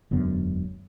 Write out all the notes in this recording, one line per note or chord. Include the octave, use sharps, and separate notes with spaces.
E1 F#2 D3 B3